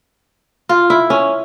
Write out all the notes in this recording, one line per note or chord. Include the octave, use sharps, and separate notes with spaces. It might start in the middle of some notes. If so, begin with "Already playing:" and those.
F4
E4
C#4